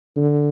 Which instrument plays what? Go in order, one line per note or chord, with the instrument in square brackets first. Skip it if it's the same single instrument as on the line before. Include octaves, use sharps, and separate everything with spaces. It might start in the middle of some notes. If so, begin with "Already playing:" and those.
[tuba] D3